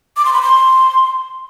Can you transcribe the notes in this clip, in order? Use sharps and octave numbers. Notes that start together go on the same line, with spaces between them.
D6
C6
B5
C6